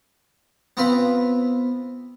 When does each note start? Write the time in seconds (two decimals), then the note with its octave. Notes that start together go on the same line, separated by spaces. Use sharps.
0.77 B3 C4 F4 B4